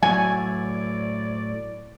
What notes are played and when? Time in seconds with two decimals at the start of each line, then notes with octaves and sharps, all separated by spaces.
0.03 A2 F#3 D5 F#5 G#5